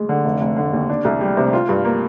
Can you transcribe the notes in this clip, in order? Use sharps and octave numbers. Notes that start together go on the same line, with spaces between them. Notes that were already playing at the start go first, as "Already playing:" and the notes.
Already playing: D2 G#3
D3
F1
F1
D3
D#2
D4
C2
G3
C3
F4
G2
A#3